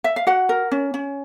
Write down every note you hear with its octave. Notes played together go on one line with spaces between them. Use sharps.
E5
F5
F#4 F#5
A#4
C#4
C#4